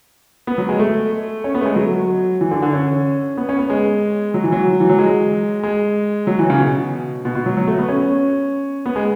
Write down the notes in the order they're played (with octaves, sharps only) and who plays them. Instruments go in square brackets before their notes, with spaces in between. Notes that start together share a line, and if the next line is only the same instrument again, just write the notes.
[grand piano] B3
F#3
G#3
A3
C#4
B3
A3
G#3
F#3
E3
D3
D3
C#4
B3
C#4
B3
G#3
F#3
E3
F#3
E3
F#3
G#3
G#3
F#3
E3
C#3
B2
B2
B2
F#3
F#3
A3
B3
C#4
B3
G#3